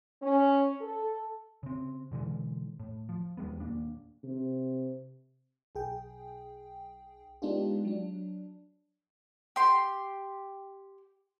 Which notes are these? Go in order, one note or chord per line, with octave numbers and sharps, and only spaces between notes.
C#4
A4
C#3 C4
B2 D3 E3 G#3
A2
F3
E2 G3 G#3 B3
D#1 A#3 D4
C3
B1 G#4 G5
G#3 B3 D4 D#4 F4 G4
F#3 D4
G4 C6